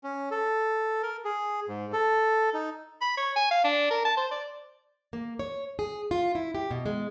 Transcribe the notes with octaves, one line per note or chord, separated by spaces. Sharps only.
C#4
A4
A#4
G#4
G#2
A4
D#4
B5
C#5
G#5
F5
D4
A#4
A5
C5
D5
A#3
C#5
G#4
F4
E4
G4
B2
G#3